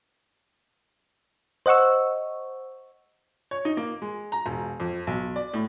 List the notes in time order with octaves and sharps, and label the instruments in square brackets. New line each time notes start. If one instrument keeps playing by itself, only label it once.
[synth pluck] C5 D#5 F#5 C#6 E6
[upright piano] C#5
D#4
A#3
G#3
A#5
E1
F2
B1
D5
A2